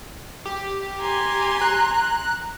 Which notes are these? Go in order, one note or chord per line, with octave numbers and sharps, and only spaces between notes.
G4
G#5 A#5 C6
F#6